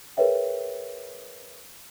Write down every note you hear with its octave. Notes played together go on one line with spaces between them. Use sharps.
G#4 A#4 B4 C#5 E5 G5